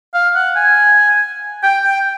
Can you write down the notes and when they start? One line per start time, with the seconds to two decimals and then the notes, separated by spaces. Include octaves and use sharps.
0.14 F5
0.35 F#5
0.56 G#5
1.63 G5
1.84 G5